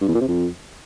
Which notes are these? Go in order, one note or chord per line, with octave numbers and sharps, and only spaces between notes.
G2
E2
A#2
C3
F2